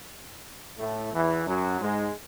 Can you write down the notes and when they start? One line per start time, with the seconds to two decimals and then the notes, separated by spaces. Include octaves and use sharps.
0.78 A2 A3
1.13 E2 E3
1.46 F#2 F#3
1.80 G#2 G#3